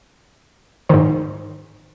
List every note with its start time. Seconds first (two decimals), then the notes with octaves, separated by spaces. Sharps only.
0.89 G#2 D#3 C5